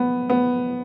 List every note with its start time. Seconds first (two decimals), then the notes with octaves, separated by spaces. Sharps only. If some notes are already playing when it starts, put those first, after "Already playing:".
Already playing: B3
0.30 B3